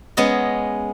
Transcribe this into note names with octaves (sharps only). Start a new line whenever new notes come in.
G#3 B3 C#4 D#5